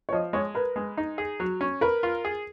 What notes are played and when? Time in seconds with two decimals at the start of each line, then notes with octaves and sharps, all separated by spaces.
0.09 C#5
0.12 F3 D#5
0.33 G#3 C#5
0.55 A#4 B4
0.76 G#3
0.97 D#4
1.18 G#4
1.40 F#3
1.61 C#4
1.81 A#4 B4
2.03 F4
2.25 G#4